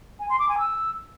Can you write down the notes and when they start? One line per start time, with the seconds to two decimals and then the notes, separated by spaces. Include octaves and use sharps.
0.20 G#5
0.29 C6
0.39 D6
0.49 G#5
0.59 E6